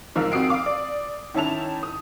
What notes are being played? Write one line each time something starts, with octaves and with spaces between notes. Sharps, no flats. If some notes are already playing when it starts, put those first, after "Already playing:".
G#2 F3 A#4 F5 E6
F2 F#4 D#6 C7 D7
F5 D6 D#6
D5
D#3 C#4 E4 A5 F7
D#6